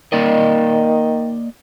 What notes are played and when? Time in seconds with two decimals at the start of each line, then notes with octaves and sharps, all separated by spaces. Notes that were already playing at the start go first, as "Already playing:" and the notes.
0.12 D#3 A#3 D5 D#5